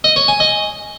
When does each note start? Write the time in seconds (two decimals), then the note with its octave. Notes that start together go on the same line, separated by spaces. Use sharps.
0.04 D#5
0.16 C#5
0.28 G#5
0.40 D#5